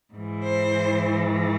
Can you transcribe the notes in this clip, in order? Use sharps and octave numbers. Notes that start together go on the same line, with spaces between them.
G#2 E3
C5